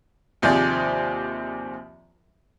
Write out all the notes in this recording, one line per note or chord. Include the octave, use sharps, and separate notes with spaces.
D#2 C3 F3 G#4 D5